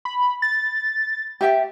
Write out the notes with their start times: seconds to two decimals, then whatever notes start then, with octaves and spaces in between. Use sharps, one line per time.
0.05 B5
0.42 A6
1.41 G4 E5 G5